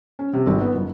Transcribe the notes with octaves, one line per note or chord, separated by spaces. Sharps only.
C#4
C3
G#1
B3
F#1